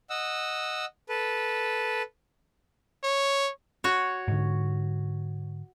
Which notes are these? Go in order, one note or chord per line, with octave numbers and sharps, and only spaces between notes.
D#5 F#5 E6
A4 B4
C#5
F#4 C#5
G#2 D3